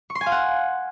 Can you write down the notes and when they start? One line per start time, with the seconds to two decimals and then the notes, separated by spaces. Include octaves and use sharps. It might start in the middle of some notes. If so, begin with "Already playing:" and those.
0.10 C#6
0.15 C6
0.21 G#5
0.26 F5
0.32 F#5